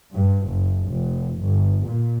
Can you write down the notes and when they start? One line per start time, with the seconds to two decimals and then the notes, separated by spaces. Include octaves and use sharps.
0.13 G2
0.47 F#1
0.87 F1
1.41 G1
1.86 A#2